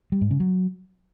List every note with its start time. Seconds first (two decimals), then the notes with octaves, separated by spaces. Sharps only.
0.12 G3
0.21 G#2
0.31 C#3
0.40 F#3